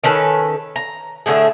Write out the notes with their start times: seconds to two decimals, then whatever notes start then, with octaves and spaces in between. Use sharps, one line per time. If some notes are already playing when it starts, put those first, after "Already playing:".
0.04 D#3 C#4 A4 B4
0.76 A#5
1.26 A2 D3 A3 G#4